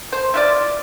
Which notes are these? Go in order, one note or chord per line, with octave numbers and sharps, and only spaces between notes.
C5
E4 F4 D5